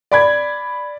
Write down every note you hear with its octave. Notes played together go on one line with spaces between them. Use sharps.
D5 B5 G#6